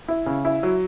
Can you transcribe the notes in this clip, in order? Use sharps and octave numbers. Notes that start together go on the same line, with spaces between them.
E4
C#3
E4
F#3